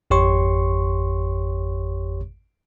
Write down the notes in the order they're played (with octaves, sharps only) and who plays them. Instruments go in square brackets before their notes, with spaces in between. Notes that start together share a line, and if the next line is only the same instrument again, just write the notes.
[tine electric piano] G#1 F2 G4 C#5 C6 C#6